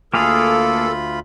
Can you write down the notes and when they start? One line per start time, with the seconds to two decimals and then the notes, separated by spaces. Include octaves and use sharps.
0.14 D2 A#3 F4 G#4 A4 F5 B5